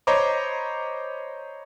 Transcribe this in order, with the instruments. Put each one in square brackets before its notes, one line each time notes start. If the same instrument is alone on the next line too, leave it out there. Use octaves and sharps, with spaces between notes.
[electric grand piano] C5 C#5 D#5 A#5 B5 D6